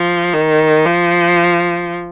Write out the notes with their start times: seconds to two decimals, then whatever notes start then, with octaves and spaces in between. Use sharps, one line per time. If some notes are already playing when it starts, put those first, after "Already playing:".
Already playing: F3
0.34 D#3
0.85 F3